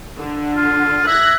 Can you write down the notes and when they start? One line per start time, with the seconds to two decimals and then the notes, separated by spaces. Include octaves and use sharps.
0.19 D3
0.56 F4
1.07 E5 F#6 G#6 A#6